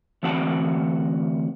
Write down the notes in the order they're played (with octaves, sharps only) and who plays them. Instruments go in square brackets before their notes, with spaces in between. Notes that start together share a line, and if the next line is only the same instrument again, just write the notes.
[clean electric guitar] D2 E3 C4 F#4 F#5 A5